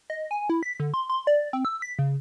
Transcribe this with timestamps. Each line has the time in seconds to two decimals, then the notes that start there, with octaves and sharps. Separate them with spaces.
0.10 D#5
0.31 G#5
0.50 E4
0.63 B6
0.80 D3
0.94 C6
1.10 C6
1.27 D5
1.53 C4
1.65 E6
1.82 B6
1.99 C#3